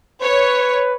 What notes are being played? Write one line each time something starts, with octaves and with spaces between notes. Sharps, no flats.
B4 C#5